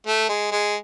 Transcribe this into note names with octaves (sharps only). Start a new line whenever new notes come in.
A3
G#3
G#3